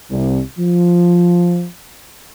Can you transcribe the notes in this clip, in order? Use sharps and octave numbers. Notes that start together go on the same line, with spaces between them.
C2
F3